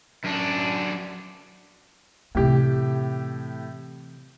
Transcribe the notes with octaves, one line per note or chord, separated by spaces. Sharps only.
F#2 D4
A2 C3 E3 G4